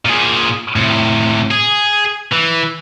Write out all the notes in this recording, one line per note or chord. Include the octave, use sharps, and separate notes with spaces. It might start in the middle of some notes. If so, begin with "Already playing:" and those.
A#2 G#4
A2 C3
G#4
E3